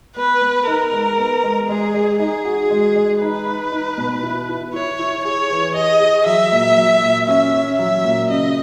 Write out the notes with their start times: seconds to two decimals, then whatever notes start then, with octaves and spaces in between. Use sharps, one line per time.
0.16 B3 B4
0.42 B3
0.67 D#4 A#4
0.92 G#3
1.18 B3
1.43 G#3
1.68 G#3 G#4
1.94 G#3
2.19 D#4 G#4
2.45 F#4
2.70 G#3
2.96 G#3
3.21 D#4 B4
3.47 D#4
3.72 D#4
3.97 B2
4.23 E4
4.49 E4
4.74 E4 C#5
4.99 E4
5.25 G#4 C#5
5.50 E3
5.75 G#4 D#5
6.00 G#4
6.26 F#3 E5
6.52 A#2
6.77 F#3
7.02 A#2
7.28 C#4 E5
7.54 C#4
7.79 F#3 E5
8.04 A#2
8.30 C#3 D#5